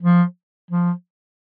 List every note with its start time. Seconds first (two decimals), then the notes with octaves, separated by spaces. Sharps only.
0.03 F3
0.71 F3